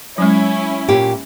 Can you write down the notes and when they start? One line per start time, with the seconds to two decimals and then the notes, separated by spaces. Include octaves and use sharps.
0.18 F#3 G#3 C#4 E4
0.88 A#2 G4